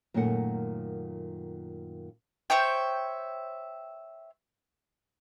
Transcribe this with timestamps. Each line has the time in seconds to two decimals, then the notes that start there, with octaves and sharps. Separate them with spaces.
0.14 F#2 A#2 D#3 A3 A#4 F#5
2.50 C5 C#5 E5 G5